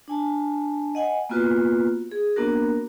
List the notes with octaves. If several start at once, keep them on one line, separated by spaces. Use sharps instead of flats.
D4 G#5 A5
D#5 F#5 G#5
A#3 B3 F4 F#4 B4
G#4
A#3 B3 D4 F#4 A#4